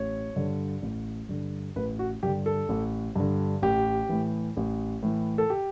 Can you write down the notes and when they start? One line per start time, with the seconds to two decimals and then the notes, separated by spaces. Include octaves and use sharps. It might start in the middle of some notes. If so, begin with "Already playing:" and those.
Already playing: A1 C#5
0.36 G2 D3
0.82 A1
1.29 G2 D3
1.76 A1 B4
1.99 F#4
2.23 G2 D3 G4
2.46 A4
2.69 A1
3.16 G2 D3
3.62 A1 G4
4.09 A2 E3
4.57 A1
5.03 A2 E3
5.38 A4
5.50 G4